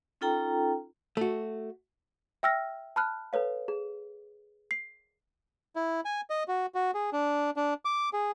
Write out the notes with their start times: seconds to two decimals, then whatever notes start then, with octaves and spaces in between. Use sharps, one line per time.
0.21 C#4 D#4 F4 A4 G5 A#5
1.17 A3 F#4
2.43 E5 G5 E6 F6 A#6
2.96 A5 B5 F6 F#6
3.33 A4 B4 C#5 F5
3.68 G#4
4.71 C7
5.76 E4
6.05 G#5
6.30 D#5
6.48 F#4
6.75 F#4
6.94 G#4
7.13 D4
7.56 D4
7.85 D6
8.13 G#4